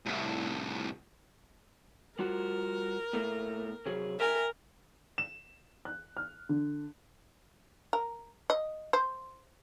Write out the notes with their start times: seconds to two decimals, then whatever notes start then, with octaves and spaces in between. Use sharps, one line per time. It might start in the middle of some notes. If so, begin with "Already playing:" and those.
0.06 C2 A2
2.19 G3 F4 F#4 A#4
3.13 A2 A3 A#3
3.86 C3 F#3 G#4
4.20 A#4 E5 G5 G#5
5.18 E7
5.85 F#6
6.17 F6
6.49 D3
7.93 A#4
8.50 D#5
8.93 C5